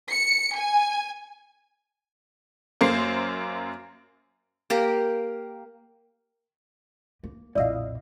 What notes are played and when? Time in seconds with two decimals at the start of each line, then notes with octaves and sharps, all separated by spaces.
0.11 C#7
0.57 G#5
2.81 F#2 A#3 C5 C7
4.70 A#3 G4 A#4
7.24 A#3
7.55 B1 F2 A#2 E4 D5 D#5 F5 E6